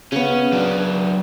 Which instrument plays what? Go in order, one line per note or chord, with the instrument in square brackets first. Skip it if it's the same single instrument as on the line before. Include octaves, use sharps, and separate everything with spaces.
[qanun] C#3 B3 [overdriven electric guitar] C#4
[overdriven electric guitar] F#3 D4